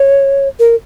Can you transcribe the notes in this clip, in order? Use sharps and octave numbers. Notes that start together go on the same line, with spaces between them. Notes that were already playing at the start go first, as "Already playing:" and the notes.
Already playing: C#5
A#4